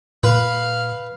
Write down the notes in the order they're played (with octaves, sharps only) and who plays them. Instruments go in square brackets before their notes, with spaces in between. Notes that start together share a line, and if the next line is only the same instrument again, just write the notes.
[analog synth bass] A#2 [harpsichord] B4 [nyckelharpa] F5